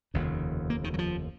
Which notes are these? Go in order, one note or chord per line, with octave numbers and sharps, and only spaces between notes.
F1 D#2 C#3
A#3
D#3
F#3
F3